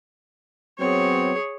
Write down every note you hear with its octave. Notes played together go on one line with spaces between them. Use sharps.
F#3 B3 C4 G#4 C#5